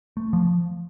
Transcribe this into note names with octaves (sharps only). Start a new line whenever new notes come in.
A3
F3